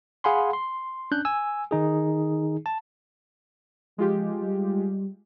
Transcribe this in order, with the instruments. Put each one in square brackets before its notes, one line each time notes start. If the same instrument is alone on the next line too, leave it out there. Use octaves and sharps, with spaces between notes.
[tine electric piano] G#4 F5 F#5 G#5 B5 C6
C6
C#4 D4 F#6 G6
G#5 E6
D#3 D#4 G#4
A5
[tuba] F3 [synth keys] G#3 F4 G4
[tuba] G3